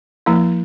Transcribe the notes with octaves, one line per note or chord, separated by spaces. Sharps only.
F3 A#3 E4